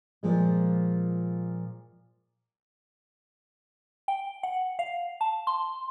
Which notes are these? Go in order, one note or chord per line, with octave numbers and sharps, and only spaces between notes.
A#2 F3 G#3
G5
F#5
F5
A5
C6